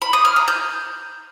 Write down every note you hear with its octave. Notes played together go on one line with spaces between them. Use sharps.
B5
D#6
F6
A#5
G6